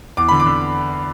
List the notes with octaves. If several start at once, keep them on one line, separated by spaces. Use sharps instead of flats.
E2 D6
D3 B5
D6
D3